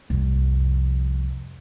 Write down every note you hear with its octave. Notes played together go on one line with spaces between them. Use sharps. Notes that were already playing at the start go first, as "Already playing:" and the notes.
C2 F2